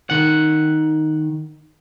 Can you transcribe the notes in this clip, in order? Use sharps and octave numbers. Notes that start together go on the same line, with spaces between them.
D#3 F#5